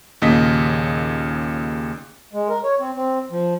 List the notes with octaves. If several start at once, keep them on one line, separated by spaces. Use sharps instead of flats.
D#2 A#2 C#3 D#5 B6
G#3
A#4
C#5
C4
C4
F3